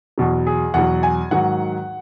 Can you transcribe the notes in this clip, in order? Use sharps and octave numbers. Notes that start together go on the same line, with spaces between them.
E2 B2 F#3
G#4
E2 B2 F#3 F#5
G#5
G#2 D#3 F#3 F#5